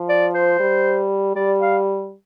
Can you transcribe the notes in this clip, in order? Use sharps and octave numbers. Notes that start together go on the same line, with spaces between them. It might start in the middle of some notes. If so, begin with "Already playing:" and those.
Already playing: F3
D5
C5
G3
G3 D5
F5